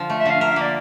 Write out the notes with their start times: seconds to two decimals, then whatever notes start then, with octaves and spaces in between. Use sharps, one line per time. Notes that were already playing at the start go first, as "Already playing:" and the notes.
Already playing: D3 F3
0.10 A3
0.20 E5
0.25 D3 F5
0.40 A#4 E5
0.51 E5
0.56 A#3 D5